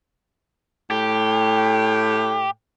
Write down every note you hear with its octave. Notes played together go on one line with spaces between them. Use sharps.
A2 G4